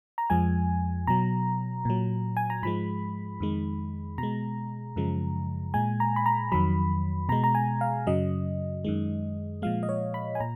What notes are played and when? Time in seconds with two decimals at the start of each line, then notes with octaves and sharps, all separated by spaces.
0.18 A#5
0.30 F2 F3 G#3 G#5
1.07 B2 F#3 A#5
1.85 A#2 F#3
2.37 G#5
2.50 A#5
2.63 G#2 F3 G#3 B5
3.40 F2 D#3 G#3
4.18 B2 G#3 A#5
4.96 F#2 C#3 F3 G#3
5.74 A#2 G#3 G#5
6.00 A#5
6.16 B5
6.26 A#5
6.52 F2 D#3 F#3 B5
7.29 B2 G#3 A#5
7.44 A#5
7.55 G#5
7.81 F5
8.07 F#2 C#3 F#3 D#5
8.84 F#2 D#3 G#3
9.62 A#2 F3 G#3 F5
9.83 D#5
9.89 C#5
10.14 B5
10.35 G#5
10.40 A#2 A#5